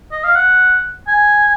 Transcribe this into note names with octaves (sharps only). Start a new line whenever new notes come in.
D#5
F5
F#5
G#5